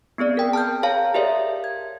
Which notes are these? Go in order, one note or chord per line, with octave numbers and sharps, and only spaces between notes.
B3 C4 G#4 D5
A#4 G5
A5 F6 G6
G#4 C#5 F5 A5 A#5
G4 A#4 C#5 D5 E5
G#6